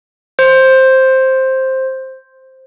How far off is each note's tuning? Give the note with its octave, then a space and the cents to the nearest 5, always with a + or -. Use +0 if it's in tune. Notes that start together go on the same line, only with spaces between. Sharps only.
C5 +5